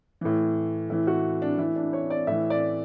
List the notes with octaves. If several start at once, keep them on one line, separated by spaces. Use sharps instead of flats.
A2 E3
A2 E3 E4
F#4
D4
A2 E3 E4
D4
C#5
D5
A2 E3 E5
D5